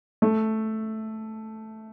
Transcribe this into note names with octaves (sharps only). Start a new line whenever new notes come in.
A3